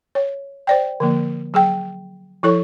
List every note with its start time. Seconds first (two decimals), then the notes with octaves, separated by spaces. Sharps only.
0.15 C#5
0.67 C5 D5 G5
1.00 D3 F3 A#3
1.54 F#3 G#4 G5
2.43 F3 E4 A4 C#5 C#6